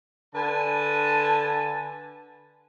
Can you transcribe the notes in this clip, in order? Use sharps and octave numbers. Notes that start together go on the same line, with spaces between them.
D3 B4 G#5 A5